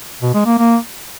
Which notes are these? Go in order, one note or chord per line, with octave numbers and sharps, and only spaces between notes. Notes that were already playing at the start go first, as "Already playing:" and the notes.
B2
G#3
A#3
A#3